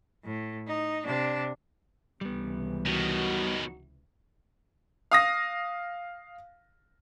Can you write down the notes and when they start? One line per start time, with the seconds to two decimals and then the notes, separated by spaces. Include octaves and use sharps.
0.24 A2
0.67 D#4
1.06 C3 D4
2.21 C#2 C3 E3 G3 B3
2.86 B2 D#3 F#3 D#4 F#4
5.11 F5 D#6 A#6